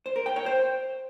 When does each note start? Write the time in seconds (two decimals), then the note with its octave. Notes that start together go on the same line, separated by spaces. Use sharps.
0.06 C5
0.16 A#4
0.26 G5
0.36 C#5
0.46 C5